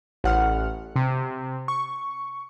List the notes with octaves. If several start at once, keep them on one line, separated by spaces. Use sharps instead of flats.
A1 F#5 F6
C3
C#6